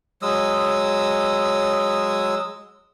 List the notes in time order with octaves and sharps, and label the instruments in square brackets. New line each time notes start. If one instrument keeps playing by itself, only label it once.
[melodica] F#3 G#3 D#6 E6